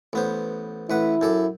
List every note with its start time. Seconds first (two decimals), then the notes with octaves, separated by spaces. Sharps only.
0.13 A1 B3 C5
0.90 A1 E4 B4 F#5
1.21 F#2 A4 D6